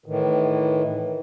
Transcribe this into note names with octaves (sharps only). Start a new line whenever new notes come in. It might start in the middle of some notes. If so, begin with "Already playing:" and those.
A2 D#3 E3